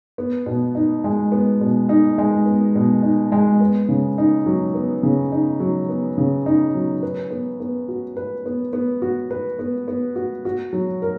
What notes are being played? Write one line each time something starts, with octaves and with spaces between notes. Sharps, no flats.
B3
B2
D#4
G#3
B3
B2
D#4
G#3
B3
B2
D#4
G#3
B3
C#3
D#4
F#3
B3
C#3
D#4
F#3
B3
C#3
D#4
F#3
B4
B3
B3
F#4
B4
B3
B3
F#4
B4
B3
B3
F#4
F#4
F#3
A#4